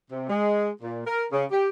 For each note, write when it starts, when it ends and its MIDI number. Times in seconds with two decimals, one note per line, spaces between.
0.11 0.25 48
0.29 0.70 56
0.82 1.01 46
1.06 1.25 70
1.32 1.44 49
1.51 1.69 67